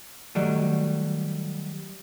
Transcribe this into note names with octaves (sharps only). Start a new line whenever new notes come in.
D#3 F#3 G3 A3